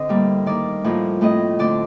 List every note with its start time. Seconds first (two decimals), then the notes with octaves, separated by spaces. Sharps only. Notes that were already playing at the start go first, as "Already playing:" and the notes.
Already playing: D3 C4 D#5
0.09 A2 G3 A#3
0.46 D#3 A#3 D5
0.84 A2 F3 A#3
1.21 A2 A3 C4 D#5
1.59 D3 A3 C4 D5